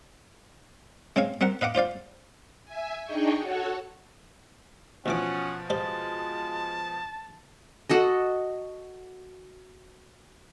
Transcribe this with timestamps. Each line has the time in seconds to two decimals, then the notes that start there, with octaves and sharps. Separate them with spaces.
1.16 G#3 C4 C#5 F5
1.41 G3 C4 A#4 F#5
1.61 B4 D#5 F5 F#5 D6
1.75 F4 C5 D5 F5
2.65 E5 G#5
3.05 D4 D#4 G#4 D#5 G5 C#6
3.40 F#4 A4 C#5 F#5
5.06 D2 B2 E3 F3 C#4 F#5 D6
5.70 G3 G#3 C5 D5 A5
7.89 F#4 A4 D#5